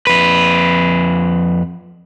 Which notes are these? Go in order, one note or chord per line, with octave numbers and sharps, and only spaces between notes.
F2 B4